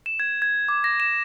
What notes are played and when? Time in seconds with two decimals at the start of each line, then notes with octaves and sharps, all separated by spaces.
0.06 E7
0.20 G#6
0.42 G#6
0.69 D6
0.84 A#6
1.00 E7